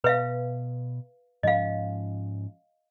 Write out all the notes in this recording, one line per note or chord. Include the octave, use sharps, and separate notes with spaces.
B2 B4 E5 F5
G#2 F3 C#4 D#5 F5